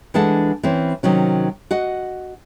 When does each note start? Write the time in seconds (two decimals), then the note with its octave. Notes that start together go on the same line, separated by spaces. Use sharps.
0.14 E3 G#3 D4 A4 F#5 A5
0.63 E3 C4 C#4
1.03 C3 D#3 F#3 C#4
1.71 F#4 D#5 F#5